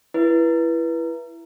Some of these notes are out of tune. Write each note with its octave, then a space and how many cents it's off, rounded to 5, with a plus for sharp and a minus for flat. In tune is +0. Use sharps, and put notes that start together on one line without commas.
E4 +20 B4 -20